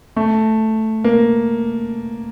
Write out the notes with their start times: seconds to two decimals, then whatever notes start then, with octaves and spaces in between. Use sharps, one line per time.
0.16 A3
1.04 A#3